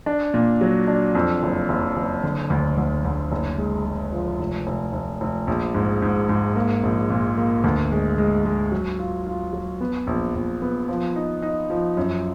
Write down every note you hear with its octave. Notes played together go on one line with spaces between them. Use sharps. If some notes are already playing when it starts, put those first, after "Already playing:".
D4
A#2
F#3
D4
F2
F#1
F#1
F#1
D3
D2
D2
D2
F#1
G#3
G#3
F3
F1
F1
F1
F1
A#1
G#2
G#2
G#2
A#3
A#1
A#2
A#3
D2
G#3
G#3
G#3
F#3
F4
F4
F#3
B3
A#1
A#1
B3
F3
D#4
D#4
F3
F#2